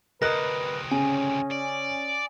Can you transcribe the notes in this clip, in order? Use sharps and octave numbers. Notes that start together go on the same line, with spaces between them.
D2 C3 A#4 B4 D#5 D#6 F#6 A#6
C#3 C#4 G#5
D5